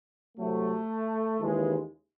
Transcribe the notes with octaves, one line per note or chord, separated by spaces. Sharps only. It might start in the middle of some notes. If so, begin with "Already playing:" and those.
C2 C3 F#3 A3
D#2 C#3 E3 G#3